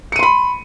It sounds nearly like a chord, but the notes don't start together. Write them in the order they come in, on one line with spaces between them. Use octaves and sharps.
C#7 D#7 C6 B5